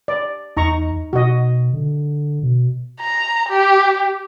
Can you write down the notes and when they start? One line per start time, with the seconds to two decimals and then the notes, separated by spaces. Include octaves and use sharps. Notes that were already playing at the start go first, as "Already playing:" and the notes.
0.08 D5
0.57 E2 D#4 A#5 C#6
1.13 B2 F#4 D#5
1.73 D3
2.43 B2
3.01 A#5
3.49 G4